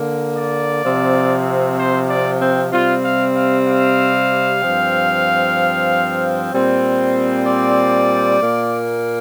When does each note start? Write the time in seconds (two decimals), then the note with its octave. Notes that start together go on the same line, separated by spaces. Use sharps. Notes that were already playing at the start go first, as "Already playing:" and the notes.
Already playing: D3 A#3
0.37 D5
0.84 C3 F3 C4
1.78 C5
2.10 D5
2.41 C4
2.73 C3 G3 C4 F4
3.05 F5
3.36 F5
3.68 F5
4.62 G2 F3 C4
6.51 A#2 G3 C4
7.45 D5
8.40 A#2 A#3